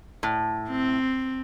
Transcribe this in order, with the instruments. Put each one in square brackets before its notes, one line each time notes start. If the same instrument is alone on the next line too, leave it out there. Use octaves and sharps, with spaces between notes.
[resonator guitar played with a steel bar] A2
[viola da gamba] C4